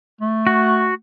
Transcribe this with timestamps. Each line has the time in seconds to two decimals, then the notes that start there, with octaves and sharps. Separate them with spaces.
0.21 A3
0.47 F#4